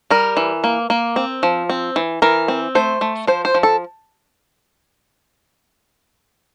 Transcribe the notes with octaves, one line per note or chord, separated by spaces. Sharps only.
G3 A#4
E3
A#3
A#3
C4
F3
C4
E3
E3 A#4
C4
A3 C5
A3
F3 C5
C5
F3
A4